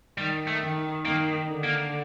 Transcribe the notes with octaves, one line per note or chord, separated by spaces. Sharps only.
D#3 G3
A3
D#3
D#3 A#3
D3
A#3